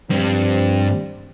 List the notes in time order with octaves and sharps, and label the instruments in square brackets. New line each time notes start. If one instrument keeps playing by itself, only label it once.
[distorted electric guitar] G2 [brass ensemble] F3 G3 C4